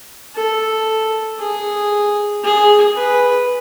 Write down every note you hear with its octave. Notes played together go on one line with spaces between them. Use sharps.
A4
G#4
G#4
B4